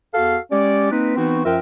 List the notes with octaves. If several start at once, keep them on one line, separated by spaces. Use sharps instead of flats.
E2 F#4 A4 F5
G#3 C#4 G4 D5
A#3 C4 D#4 B4
E3 B3 C4 D#4 F#4
F#2 F3 F4 A#4 E5 G5